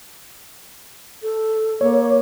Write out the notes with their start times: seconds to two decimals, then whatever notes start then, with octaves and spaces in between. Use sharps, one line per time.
1.23 A4
1.81 A#3 C#5